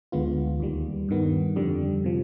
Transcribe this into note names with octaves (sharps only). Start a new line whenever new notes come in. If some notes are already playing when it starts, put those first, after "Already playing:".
D2 D3 G#3 B3 F4
D#2 D#3 G3
G2 D#3 B3
F2 D3 G3
C3 F3